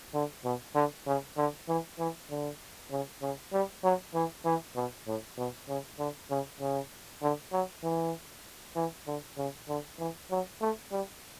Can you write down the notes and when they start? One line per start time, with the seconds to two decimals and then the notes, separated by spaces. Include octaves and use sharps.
0.14 D3
0.44 B2
0.75 D3
1.07 C#3
1.37 D3
1.68 E3
1.99 E3
2.30 D3
2.91 C#3
3.22 C#3
3.53 G3
3.84 F#3
4.15 E3
4.45 E3
4.76 B2
5.07 A2
5.38 B2
5.68 C#3
5.99 D3
6.30 C#3
6.61 C#3
7.22 D3
7.53 F#3
7.84 E3
8.76 E3
9.07 D3
9.38 C#3
9.68 D3
9.99 E3
10.31 F#3
10.61 A3
10.92 G3